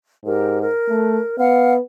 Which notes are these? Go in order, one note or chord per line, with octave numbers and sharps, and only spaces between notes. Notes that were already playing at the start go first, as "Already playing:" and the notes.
G#2 G4 A#4
A#4
A3
B3 F5 F#5 F6